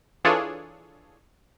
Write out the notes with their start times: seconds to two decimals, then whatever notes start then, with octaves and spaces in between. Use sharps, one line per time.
0.24 E3 D4 F4 G#4 A4 C#5